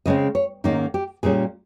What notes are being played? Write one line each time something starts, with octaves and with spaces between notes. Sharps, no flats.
C#3 G#3 C4 D#5
C#5
G#2 D#3 A#3 C#4 D#4
G4
A#2 G3 C#4 G#4